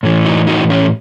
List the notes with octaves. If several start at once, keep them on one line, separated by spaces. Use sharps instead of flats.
A2 E3
D#4 F#4
D#4 F#4
C#4 E4